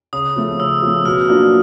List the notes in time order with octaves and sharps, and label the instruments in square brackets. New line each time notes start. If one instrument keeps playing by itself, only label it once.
[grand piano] C#3 [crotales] D#6
[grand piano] F3 A3
[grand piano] C#3 [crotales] E6
[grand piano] F3 A3
[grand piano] B2 [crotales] F6
[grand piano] F#3 A#3 D4 F4